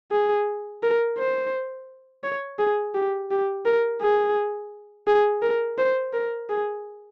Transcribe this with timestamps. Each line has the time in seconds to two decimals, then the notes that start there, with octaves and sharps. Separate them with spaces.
0.12 G#4
0.83 A#4
1.19 C5
2.24 C#5
2.59 G#4
2.94 G4
3.31 G4
3.66 A#4
4.02 G#4
5.07 G#4
5.42 A#4
5.78 C5
6.13 A#4
6.49 G#4